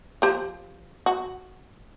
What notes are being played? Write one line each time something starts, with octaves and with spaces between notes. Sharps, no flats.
F3 G4 C5
F#4